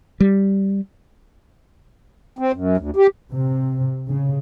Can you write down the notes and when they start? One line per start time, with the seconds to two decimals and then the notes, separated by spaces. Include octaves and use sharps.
0.20 G3
2.39 C4
2.53 F#2
2.77 D2
2.96 G4
3.32 C3
4.09 C#3